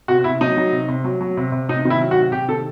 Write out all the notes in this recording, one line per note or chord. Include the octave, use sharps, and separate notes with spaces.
C3 F#4
C3 E4
F#3 D#4
F#3
C3
C3
F#3
F#3
C3
C3
C3 D#4
D#3
E4
F#3
F#4
C3
C3 G4
D#3 A4